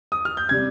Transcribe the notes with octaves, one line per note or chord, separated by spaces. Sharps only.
D#6
F6
G6
C3 G3 G#6